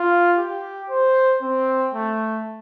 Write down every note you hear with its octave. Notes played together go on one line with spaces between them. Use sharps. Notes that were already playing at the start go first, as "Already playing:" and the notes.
Already playing: F4
G4
C5
C4
A3